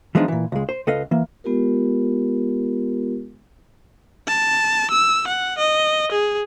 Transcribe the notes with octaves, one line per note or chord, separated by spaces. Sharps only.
E3 F3 G#3 B3 D4 D#4
A#2 E3
C#2 G#3
C5
C#2 A4 B4 D#5 F5
E3 A#3
G#3 B3 F4 G4 A#4
A5
E6
F#5
D#5
G#4